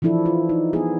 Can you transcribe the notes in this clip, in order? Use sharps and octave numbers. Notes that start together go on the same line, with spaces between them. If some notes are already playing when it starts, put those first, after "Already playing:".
E3 F3 D4 E4 A4
F4
D#4
B3 G#4